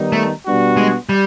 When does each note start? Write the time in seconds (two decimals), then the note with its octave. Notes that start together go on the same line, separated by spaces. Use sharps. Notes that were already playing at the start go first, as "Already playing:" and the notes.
Already playing: D#3 G3 B3 D#4
0.12 A3
0.45 B2 G3 B3 D4 F#4
0.77 G#3
1.09 G3